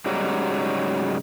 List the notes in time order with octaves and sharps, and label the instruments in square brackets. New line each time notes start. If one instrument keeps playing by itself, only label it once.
[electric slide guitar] G#2 C#3 F#3 G3 D#4